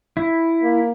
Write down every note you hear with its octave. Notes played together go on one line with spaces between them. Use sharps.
E4
A#3